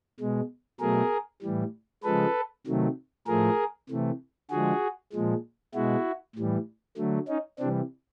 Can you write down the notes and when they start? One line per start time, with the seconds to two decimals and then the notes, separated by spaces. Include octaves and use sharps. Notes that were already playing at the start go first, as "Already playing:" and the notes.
0.20 B2 G#3
0.80 B2 F#3 A3 G#4 A#4
1.42 A2 E3 G3
2.03 C#3 F3 G#3 A4 B4
2.66 C3 D#3 F#3 A3
3.27 A2 F3 A3 G#4 A#4
3.89 C3 E3 A3
4.50 D3 F3 G#3 F#4 G#4
5.12 A#2 F3 G#3
5.74 B2 G#3 E4 F#4
6.35 A2 E3 G3
6.97 D3 F#3 A3
7.28 C#4 D#4
7.59 C3 E3 G3 C4 D4